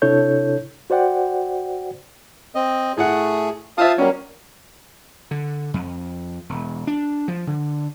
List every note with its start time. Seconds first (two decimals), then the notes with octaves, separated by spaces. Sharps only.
0.02 C3 D4 E4 A4 C#5 G6
0.90 F#4 C5 D5 F#5 G5
2.55 C4 D#5
2.97 A2 A3 G#4 F#5
3.78 F4 C5 E5 F5 A5 D#6
3.98 F#3 G3 A#3 C#4
5.31 D3
5.74 F2
6.49 E1
6.87 D4
7.28 F3
7.47 D3